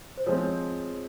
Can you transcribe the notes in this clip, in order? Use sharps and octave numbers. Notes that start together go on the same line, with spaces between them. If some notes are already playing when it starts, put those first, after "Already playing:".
C5
F3 G#3 C4 C#5